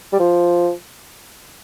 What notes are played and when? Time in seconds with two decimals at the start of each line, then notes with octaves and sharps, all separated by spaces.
0.12 G3
0.19 F3